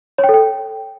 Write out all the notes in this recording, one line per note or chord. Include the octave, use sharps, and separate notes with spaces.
C#5
G5
A4
G5